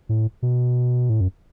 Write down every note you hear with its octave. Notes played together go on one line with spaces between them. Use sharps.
A2
B2
A2
F#2